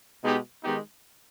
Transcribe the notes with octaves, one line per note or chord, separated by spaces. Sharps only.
B2 G#3 B3 D#4 G4
D#3 G#3 B3 D#4 G4